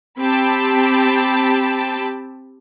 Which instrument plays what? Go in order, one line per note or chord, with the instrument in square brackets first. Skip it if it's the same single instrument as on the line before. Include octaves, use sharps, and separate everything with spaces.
[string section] C4 G4 G5 A5 B5